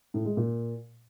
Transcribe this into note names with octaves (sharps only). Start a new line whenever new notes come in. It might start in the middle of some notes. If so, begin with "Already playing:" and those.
A2
G#3
A#2